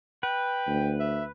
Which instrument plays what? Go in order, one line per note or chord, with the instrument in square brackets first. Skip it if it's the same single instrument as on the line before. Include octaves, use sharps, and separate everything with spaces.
[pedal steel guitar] B4 [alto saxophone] G5
[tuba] D2
[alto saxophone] E5